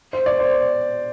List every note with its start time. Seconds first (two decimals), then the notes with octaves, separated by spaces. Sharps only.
0.13 C5
0.26 D5
0.40 C5